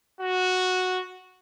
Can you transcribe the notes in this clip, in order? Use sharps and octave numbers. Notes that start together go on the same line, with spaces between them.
F#4